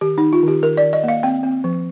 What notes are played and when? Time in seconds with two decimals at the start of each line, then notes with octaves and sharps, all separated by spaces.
0.01 D#3 G4
0.18 D#4
0.22 D#3
0.33 F4
0.43 D#3 G4
0.62 D#3 A#4
0.77 D5
0.83 D#3
0.93 D#5
1.03 A#3
1.08 F5
1.23 C4 G5
1.43 C4
1.64 F3